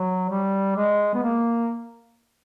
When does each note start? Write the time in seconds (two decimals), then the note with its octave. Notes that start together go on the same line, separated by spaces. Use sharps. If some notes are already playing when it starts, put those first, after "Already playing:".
Already playing: F#3
0.30 G3
0.76 G#3
1.14 B3
1.23 A#3